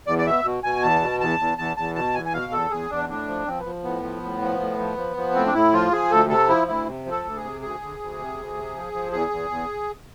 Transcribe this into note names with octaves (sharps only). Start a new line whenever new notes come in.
E2 D5
D5
B2 E5
B2
B2 G#5
E2 A5
B2
E2 A5
E2
E2 A5
E2 A5
B2 A5
E2 G#5
G#5
B2 F5
E2 A4
E2 G#4
E2 D4
A2 D4
F3
F3 C4
B3
F3
A2 B3
F3
A2
F3
A2
F3
F3
F3
A2 C4
D4
A2 E4
F3 F4
F3 G#4
D2 A4
C3 A4
F3 E4
D2 E4
C3
F3
A4
D2
G#4
C3
D2 G#4
D2
D2
C3
D2
C3
F3
F3
E2 G#4
E2
E2